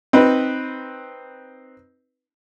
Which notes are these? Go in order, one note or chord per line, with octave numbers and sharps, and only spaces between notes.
C4 D#4 B4